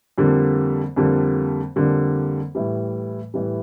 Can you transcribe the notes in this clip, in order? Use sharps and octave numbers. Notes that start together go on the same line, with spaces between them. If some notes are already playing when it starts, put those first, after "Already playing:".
F2 D3 G3 A#3
F2 D3 G3 A#3
F2 D3 G3 A#3
A2 E3 G3
A2 E3 G3